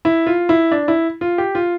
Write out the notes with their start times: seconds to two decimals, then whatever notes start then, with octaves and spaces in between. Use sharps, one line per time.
0.05 E4
0.27 F4
0.49 E4
0.72 D4
0.88 E4
1.21 F4
1.38 G4
1.55 F4